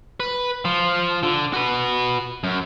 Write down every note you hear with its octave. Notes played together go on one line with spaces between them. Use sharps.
B4
F3 F4
D3
F#4 B4
F#2